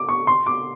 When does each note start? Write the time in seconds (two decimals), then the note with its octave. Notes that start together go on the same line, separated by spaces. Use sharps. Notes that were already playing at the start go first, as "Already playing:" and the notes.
Already playing: D6
0.09 C#6
0.27 C6
0.46 D6